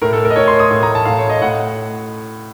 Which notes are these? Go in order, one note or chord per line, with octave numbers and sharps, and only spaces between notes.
A2 A#4
A4
A#4
D#5
A2 C#5
C6
D#6
A2
A#5
A5
A2 F5
C#5
D#5
A2 F#5